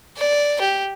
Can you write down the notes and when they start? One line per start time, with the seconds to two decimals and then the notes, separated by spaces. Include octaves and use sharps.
0.17 D5
0.61 G4